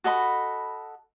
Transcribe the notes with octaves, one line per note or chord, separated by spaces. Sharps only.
F#4 A4 D#5 B5